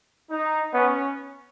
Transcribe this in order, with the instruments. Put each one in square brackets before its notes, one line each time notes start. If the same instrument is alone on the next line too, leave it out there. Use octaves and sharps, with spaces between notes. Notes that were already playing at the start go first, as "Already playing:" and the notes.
[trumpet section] D#4
[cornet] B3 [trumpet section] C#4